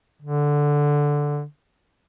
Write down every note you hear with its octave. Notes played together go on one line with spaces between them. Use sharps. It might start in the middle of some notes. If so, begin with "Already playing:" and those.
D3